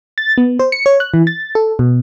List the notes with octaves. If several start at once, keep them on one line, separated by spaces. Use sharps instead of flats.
A6
B3
C5
C#7
C#5
F#6
E3
A6
A4
B2